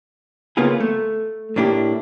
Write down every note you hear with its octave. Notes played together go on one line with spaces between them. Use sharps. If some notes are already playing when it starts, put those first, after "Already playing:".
C#3 A#3 B3 F4 G#4
A3
A2 A#3 D4 E4 G4